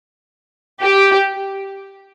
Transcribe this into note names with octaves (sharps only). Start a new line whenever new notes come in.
G4